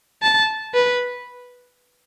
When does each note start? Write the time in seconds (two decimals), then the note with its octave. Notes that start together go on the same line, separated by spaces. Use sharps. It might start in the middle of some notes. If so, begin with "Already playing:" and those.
0.23 A5
0.74 B4